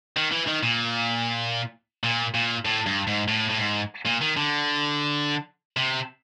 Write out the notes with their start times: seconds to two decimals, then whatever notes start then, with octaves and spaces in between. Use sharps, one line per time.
0.16 D#3
0.31 E3
0.47 D#3
0.63 A#2
2.03 A#2
2.34 A#2
2.65 A2
2.86 G2
3.07 G#2
3.28 A2
3.49 A2
3.58 G#2
4.06 A#2
4.21 D#3
4.36 D3
5.77 C3